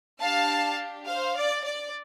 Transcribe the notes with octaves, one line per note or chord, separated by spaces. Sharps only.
D4 G4 F5 A5
C5 F5
D5
D5